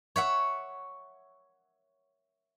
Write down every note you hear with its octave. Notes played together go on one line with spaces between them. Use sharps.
C#5 E5 F#5